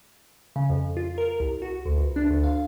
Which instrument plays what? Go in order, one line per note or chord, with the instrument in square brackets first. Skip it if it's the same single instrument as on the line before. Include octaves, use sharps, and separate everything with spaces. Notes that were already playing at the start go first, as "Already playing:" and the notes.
[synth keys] C#3
F2
F4
A#4
C2
F#4
D2
C#2
D4
D2
F5